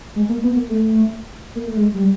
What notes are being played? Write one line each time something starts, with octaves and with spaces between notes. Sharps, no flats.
G#3
A#3
B3
A#3
A3
A#3
A3
G#3
G3